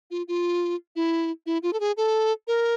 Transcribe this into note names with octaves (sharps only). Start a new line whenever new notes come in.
F4
F4
E4
E4
F4
A4
G#4
A4
A#4